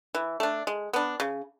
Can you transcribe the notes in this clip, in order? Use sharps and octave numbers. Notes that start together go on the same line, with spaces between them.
E3
A3 D4
G#3
B3 D4
C#3